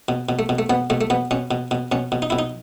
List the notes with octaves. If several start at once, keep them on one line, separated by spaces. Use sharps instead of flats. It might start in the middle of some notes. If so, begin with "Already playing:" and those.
B2
B2
A3
B2
A3
B2 B3
B2 A3
A3
B2 B3
B2 C#4
B2
B2
B2 C#4
B2
D#4
B2 E4
D#4